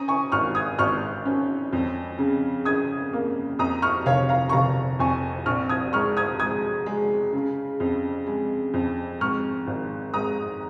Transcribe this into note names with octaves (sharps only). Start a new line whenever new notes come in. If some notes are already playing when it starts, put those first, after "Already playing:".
Already playing: C#4 A#5 D#6
G#5 C#6
G#1 C#6 F6
D#6 G#6
G#1 C#6 F6
C#4
F2
C#3
C#3 D#6 G#6
A#3
F2 A#5 D#6
C#6 F6
F1 C#5 F5
F5 A#5
C#6
F1 F5 A#5
F2 G#5 C#6
A#1 C#6 F6
D#6 G#6
G#2 C#6 F6
D#6 G#6
G#3 D#6 G#6
G#3
C#3
F2
G#3
F2
G#2 C#6 F6
G#1
G#2 A#5 D#6